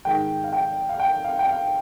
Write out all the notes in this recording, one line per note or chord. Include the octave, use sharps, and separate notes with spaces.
G#2 D#3 G#3 G5
F5
G5
F5
G5
F5
G5
F5